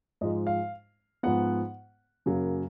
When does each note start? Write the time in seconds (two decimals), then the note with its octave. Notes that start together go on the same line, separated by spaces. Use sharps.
0.21 G#2 F3 G#3 D#5
0.47 F5
1.23 G#2 F3 B3 F#5
2.26 F#2 C#3 F#3 A#3